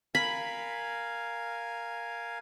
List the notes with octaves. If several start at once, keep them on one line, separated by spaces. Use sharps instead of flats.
A#4 F5 G#5 B5